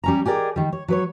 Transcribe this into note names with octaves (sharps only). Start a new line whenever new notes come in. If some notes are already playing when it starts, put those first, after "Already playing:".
G3 C#4 A#5
G4 G#4 A#4 D5 D#5
D#3 G3
C#5
F#3 B4 C#5